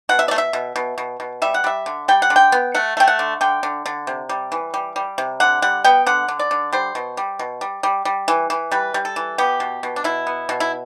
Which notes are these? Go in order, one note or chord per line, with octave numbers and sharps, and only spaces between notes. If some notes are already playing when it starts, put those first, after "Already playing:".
B2 F#5
E5
D5
A3
E5
B2
B2
B2
B2
G3 E5
F#5
G3 E5
D3
G3 G5
F#5
D3
G5
B3
A3 F#5
A3 G5
F#5
D3
D3 G5
D3
D3
C3
G3
E3
G3
G3
C3
D3 F#5
G3 F#5
B3 G5
D3 F#5
D3
D5
D3
G3 C5
B2
G3
B2
G3
G3
G3
E3
E3
G3 B4
G3
A4
E3
B3 G4
B2
B2
D4
B2 E4
B3
B2
E4